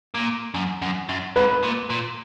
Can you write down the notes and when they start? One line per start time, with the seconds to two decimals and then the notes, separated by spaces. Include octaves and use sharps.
0.14 A#2
0.54 F#2
0.82 F#2
1.09 F#2
1.36 G#2 B4
1.63 A#2
1.90 A#2